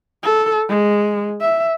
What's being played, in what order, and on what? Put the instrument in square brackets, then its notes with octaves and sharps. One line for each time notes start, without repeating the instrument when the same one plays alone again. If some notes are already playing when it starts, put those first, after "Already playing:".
[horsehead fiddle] A4
G#3
E5